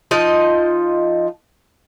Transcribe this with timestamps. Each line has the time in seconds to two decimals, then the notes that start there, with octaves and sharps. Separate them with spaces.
0.11 F3 D#4 D#5